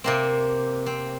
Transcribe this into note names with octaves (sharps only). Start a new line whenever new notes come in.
C3 A#3 C4
C4